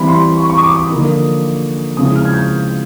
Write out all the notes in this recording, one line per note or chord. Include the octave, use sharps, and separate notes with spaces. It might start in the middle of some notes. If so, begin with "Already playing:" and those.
Already playing: E3 G3 C4 B5
C6
C#6
C#6
D#6
D6
D#6
D3 F3 A#3 D#4
C#3 F3 G#3 C4 E4 D#6
F6
G#6
G6